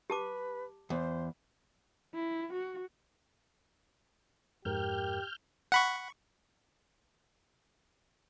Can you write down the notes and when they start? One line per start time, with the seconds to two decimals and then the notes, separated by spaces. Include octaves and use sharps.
0.10 G4 B4 A5 D6
0.90 E2 C5
2.15 E4
2.53 F#4
4.65 F2 G#2 G4 A#4 F6 G6
5.72 F#5 B5 C#6